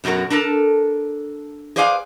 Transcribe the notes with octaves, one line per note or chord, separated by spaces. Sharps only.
F#2 B2 F#3 F#4 A#4
D4 A4 A#4 A5
G#4 B4 C5 D5 F5 G#5